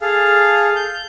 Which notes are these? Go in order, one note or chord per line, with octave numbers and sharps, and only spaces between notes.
G#4 A4 F5
G6